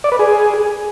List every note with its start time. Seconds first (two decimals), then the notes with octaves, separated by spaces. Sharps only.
0.04 D5
0.12 B4
0.19 G#4